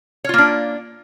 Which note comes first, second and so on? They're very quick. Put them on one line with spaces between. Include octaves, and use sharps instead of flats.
C#5 F4 A#3 D4